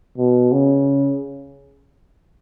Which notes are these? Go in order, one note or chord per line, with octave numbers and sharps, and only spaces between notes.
B2
C#3